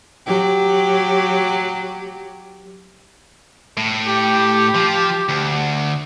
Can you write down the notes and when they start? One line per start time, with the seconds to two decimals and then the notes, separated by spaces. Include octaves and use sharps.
0.26 F#3 G4
3.77 A2
4.07 G4
4.75 F3
5.29 D2